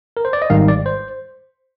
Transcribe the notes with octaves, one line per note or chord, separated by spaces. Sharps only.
A#4
C5
D5
D#5
G#1 G#2 D#3 G3 F5
D5
C5